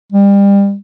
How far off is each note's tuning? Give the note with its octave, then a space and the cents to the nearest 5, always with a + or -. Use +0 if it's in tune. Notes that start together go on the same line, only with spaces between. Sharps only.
G3 +30